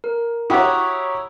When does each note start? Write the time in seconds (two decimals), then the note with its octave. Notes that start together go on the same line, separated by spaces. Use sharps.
0.04 A#4
0.50 E4 F#4 G4 C#5 A#5 D#6